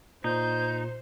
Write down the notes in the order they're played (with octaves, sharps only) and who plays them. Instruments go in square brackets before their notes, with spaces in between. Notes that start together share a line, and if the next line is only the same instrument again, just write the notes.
[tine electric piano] A#2 [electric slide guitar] D#4 [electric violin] C5 [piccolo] G6